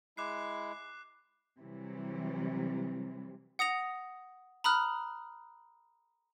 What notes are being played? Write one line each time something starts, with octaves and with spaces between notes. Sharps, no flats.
G#3 E4 D6 F#6 C7
C3 E3 F#3 G3
F#5 D#6 A#6 F7
A#5 B5 D#6 F6 F#6